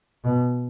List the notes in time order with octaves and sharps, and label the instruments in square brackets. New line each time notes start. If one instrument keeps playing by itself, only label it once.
[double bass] B2